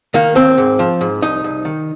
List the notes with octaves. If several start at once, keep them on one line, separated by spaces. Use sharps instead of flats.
D#3 A#3
D#2 C4
G#2
F3
G#2
C2 D#4
C2
D#3